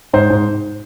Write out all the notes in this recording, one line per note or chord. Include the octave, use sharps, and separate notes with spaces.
G#2 C5
G#2